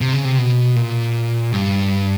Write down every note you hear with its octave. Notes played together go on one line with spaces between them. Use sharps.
C3
C#3
C3
B2
A#2
G2